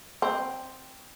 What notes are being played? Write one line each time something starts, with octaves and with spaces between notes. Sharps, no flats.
C4